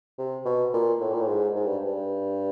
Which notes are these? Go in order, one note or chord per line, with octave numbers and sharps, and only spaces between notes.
C3
B2
A#2
A2
A#2
A2
G#2
G#2
G2
G2